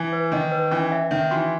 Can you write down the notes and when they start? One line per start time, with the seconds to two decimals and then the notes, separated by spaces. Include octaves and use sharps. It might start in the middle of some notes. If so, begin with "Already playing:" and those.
Already playing: E3 G#5
0.12 B4
0.32 D#3 D#5
0.52 B4
0.71 E3 C#4
0.92 E5
1.11 D#3 E5
1.31 E3 F#4